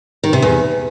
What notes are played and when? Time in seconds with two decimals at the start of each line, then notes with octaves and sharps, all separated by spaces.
0.23 D#3
0.33 C3
0.42 E2